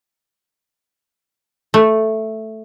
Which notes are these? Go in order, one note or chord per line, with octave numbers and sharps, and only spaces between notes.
A3